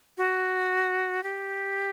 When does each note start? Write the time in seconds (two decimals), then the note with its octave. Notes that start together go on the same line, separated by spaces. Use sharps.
0.18 F#4
1.23 G4